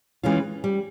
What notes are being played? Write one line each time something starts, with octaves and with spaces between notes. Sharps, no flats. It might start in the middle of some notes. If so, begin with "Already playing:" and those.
E3 G#3 C#4 F4
G3